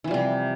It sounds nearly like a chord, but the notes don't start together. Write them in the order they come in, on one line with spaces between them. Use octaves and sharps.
E3 F3 G3 C3